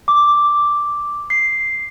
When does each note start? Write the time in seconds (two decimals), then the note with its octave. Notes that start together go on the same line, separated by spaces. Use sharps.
0.08 D6
1.30 C7